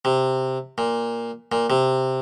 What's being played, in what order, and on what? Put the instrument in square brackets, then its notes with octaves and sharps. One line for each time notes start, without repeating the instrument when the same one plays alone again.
[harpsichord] C3
A#2
A#2
C3